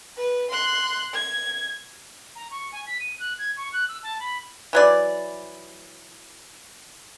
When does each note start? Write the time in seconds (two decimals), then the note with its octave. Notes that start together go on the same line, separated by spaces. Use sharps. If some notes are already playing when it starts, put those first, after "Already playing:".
0.17 B4
0.51 C6 F#6
1.13 G#6
2.35 A#5
2.51 C#6
2.72 G#5
2.86 B6
2.99 D#7
3.19 F#6
3.38 G#6
3.57 C#6
3.72 F#6
3.88 E6
4.03 A5
4.19 B5
4.73 E3 F#3 D5